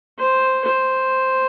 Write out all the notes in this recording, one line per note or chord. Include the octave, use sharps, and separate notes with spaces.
C5
C5